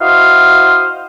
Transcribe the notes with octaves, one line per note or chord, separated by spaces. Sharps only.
E4 F#4 C5 D#5 F5